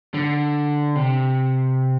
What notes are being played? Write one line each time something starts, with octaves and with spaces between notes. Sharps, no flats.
D3
C3